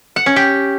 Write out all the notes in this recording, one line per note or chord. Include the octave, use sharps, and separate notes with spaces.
F#5
C#4
G4